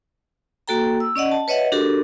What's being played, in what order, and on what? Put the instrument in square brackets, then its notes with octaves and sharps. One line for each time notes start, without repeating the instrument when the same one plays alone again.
[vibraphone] A#3 F#4 A4 G5 A#5
E6
C#4 D5 D#5 F#5
A5
B4 C#5 D#5 E5 F#5
D4 F#4 G4 A4 A#4